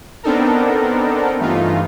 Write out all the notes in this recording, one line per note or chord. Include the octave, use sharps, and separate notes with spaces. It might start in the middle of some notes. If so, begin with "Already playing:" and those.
B3 C4 D4 D#4 A4 A#4
G2 E3 A3 D#4 F4